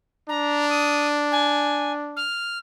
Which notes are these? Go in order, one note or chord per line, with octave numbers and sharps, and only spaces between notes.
D4 A#5
D#6
G#5
F6